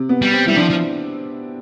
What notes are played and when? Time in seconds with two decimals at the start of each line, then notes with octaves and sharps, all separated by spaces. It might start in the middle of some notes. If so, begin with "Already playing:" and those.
Already playing: C3
0.09 B3
0.22 G3
0.32 C4
0.46 G3 E4
0.56 F3 D4
0.70 F3